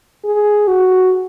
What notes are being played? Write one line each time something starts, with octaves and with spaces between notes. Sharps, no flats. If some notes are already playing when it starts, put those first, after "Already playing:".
G#4
F#4